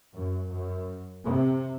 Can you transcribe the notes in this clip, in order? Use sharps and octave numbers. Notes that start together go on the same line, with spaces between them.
F#2
F#2
C3